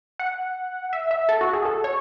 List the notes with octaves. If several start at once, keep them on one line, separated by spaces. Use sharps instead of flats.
F#5
E5
E5
A4
F#4
G#4
A4
C#5